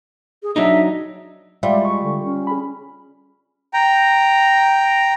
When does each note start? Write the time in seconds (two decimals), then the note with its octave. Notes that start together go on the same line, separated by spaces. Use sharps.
0.43 G#4
0.56 F#3 D4 D#4 E5
1.63 G3 G#3 F4 D5 E5
1.85 C#6
2.03 D3
2.23 C#4
2.47 G#4 B5
3.73 G5 A#5